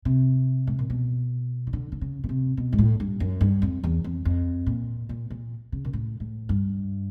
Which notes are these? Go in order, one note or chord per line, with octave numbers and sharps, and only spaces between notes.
C3
A2
A#2
B2
D#3
D3
D3
C#3
B2
C3
B2
G#2
A2
G2
F#2
G2
F2
E2
F2
F2
A#2
A#2
A#2
C#3
A#2
A2
A2
G2